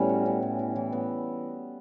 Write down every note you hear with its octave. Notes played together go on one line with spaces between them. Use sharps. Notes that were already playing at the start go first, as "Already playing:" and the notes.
Already playing: A2 G3 B3 C#4
F#4
C#4
A2
E4
E3
B3